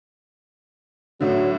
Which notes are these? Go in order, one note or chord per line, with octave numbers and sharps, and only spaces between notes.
A2 D3 F#3